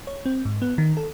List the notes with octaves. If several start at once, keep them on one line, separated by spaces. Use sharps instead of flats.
C#5
C4
G#2
B3
D#3
A4